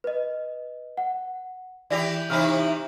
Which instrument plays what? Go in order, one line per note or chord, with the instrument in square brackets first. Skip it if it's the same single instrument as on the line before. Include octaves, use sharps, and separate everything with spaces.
[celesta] B4 D#5
F#5
[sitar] E3 G4 [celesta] D5 A#6 F7
[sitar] C3 E3 D#4 [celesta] F6